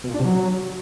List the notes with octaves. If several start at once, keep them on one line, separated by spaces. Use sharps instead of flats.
B2
A#2
D4
C3
F#3